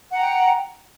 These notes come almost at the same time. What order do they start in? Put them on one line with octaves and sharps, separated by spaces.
F#5 A#5 G5